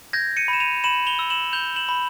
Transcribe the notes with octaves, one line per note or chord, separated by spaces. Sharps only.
G6 G#6 A#6
C#7 D#7
B5
E7
D#7 F7
B5 E7 F#7
F7 G7
E6
E7 F#7
G6 F7 G7
E7 F#7
B5